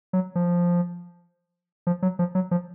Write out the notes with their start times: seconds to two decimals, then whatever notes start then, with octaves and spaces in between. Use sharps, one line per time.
0.13 F#3
0.35 F3
1.87 F3
2.02 F#3
2.19 F3
2.35 F#3
2.51 F3